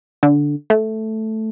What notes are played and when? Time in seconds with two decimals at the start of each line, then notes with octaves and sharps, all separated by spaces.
0.23 D3
0.70 A3